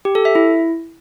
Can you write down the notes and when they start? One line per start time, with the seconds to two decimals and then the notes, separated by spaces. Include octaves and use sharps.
0.05 G4
0.15 A4
0.25 E5
0.35 E4